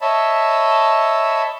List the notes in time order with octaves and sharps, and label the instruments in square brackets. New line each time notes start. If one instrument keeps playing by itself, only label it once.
[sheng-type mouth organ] C#5 D#5 E5 A5 B5